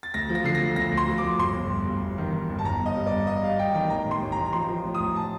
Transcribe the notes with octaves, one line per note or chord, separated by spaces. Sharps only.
A6
D2 A#6
F3
A#6
D3 C7
A#6
D2
D2 A#6
D2
C6
F3
D6
D2
G1 C6
G1
G1
G2
G1
D#3
D#3
G1
A5
G1 A#5
G1 D#5
G2
D5
G1
G2 D#5
G2 F5
G2 G5
D#3 G5
A1 A#5
A2
C6
A1
A#5
A1
A#5
F3 C6
F3
A1
D#6
A1
A5